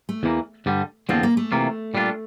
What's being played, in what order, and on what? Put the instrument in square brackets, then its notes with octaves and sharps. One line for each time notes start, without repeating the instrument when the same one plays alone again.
[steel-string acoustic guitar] A3
[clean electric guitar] E2 E3 G3 A#3
G2 D3 G3
[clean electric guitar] E2 D3 F3 C4 F4 [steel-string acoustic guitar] A#3
[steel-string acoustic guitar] A#3
A3
[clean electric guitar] C3 E3 A#3 F4
A#2 G3 D4 F4